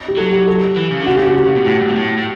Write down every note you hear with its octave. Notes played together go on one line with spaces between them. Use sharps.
G4
F#3 A4
G4
A4
E3
C#3
D3
F#4
C#3
G4
F#4
F#4
C#3
B2
A2
G2
B2
A2
A2